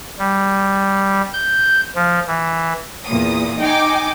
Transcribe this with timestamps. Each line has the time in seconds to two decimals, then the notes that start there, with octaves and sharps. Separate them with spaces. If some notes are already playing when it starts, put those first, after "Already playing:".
0.18 G3
1.33 G6
1.95 F3
2.27 E3
3.05 E2 A#2 D#6
3.60 D#4 G5 G#5 D6